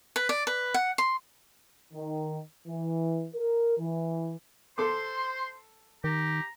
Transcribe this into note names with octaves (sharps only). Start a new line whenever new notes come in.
B4
D5
B4
F#5
C6
D#3
E3
A#4
E3
A4 C5 C6 D6
D#3 G4 A#5